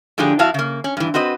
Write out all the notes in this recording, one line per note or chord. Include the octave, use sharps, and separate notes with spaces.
A2 D3 F3 D4 G4 G#4
F2 E4 F#4 F5 A5
C#3 A#3
C#4
G2 E3
C4 F#4 B4 D#5